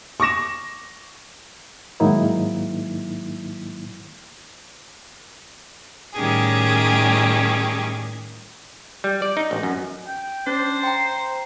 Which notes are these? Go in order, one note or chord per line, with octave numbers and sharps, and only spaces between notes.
C#6 D6 A#6 E7
G#2 D#3 F#3 A#3 D#4 E4
A2 D#3 G3 C#4 G4 G#4
G3
D5
D#4
A1
F#2
G5
C#4 D4 C5
G5 A#5 C6